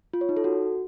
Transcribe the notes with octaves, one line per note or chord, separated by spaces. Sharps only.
F4
C#5
D#4
A4
F#4